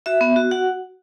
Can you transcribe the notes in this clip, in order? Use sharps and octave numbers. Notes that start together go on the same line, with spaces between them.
F#4 E5
B3
F#4
F#4 F#5